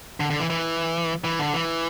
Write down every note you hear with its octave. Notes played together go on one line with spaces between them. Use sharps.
D3
D3
E3
E3
E3
D3
E3